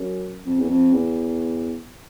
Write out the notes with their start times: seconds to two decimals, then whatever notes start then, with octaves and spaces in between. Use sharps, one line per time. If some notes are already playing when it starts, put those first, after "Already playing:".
Already playing: F#2
0.45 F2
0.59 E2
0.68 F2
0.93 E2